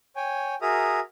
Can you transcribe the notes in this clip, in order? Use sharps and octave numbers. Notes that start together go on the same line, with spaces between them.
C#5 G5 G#5
F#4 G#4 A#4 E5 A#5 D#6